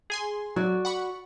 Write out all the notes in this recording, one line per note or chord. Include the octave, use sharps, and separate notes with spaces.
G#4 G#5 C6
F#3 F#4 D5
F#5 B5 C#6